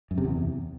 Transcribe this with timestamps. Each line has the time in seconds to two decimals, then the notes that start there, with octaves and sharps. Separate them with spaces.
0.11 F#2
0.18 C3
0.25 E2